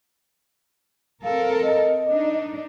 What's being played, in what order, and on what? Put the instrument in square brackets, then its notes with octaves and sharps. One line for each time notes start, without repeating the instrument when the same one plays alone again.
[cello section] C4 A4 A#4 [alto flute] F5
[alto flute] D#5
[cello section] D4 D#4